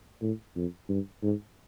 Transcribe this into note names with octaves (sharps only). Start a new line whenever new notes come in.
A2
F2
G2
G#2